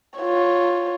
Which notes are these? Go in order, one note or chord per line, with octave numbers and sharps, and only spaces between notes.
F4 C#5